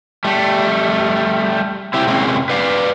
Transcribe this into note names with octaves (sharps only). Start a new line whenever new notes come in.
G3 A3
C4 E4 G4
C3 G#3 A#3 C4 C#4
B4 D5 F5